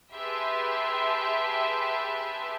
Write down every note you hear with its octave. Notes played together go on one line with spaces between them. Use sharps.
G4 G#4 B4 E5 A5 C6